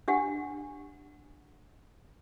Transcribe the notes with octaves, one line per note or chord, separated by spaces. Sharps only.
D4 G4 F#5